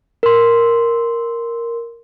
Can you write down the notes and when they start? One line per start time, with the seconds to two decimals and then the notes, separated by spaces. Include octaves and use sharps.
0.23 A#4 C6